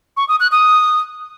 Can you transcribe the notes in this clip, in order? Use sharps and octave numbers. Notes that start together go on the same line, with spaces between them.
C#6
D#6
F#6
D#6